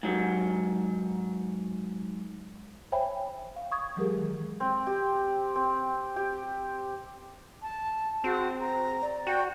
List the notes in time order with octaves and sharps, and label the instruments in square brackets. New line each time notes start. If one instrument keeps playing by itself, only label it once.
[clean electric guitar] G#2 F#3
[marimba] C5 C#5 E5 G5 G#5 B5
F5
C#6 D#6 G#6
E3 F#3 G#3 G4 G#4 A#4
D#3 G#3
[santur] C4
G4
C4
G4
[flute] A5
[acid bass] C4 [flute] F#4 [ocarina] G#4
[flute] A#5
[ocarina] D5
[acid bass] F#4 [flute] G5